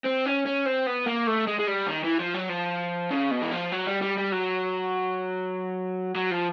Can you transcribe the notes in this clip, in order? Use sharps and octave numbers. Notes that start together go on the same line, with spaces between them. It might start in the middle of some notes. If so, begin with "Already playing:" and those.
C4
C#4
C#4
C4
B3
A#3
A3
G#3
G#3
G3
D#3
E3
F3
F#3
F3
C#3
B2
E3
F3
F#3
G3
G3
G3
F#3
F#3
F3